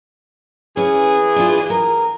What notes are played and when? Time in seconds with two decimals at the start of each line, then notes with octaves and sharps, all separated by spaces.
0.77 E3 C#4 G#4
1.36 D4 F4
1.70 A#4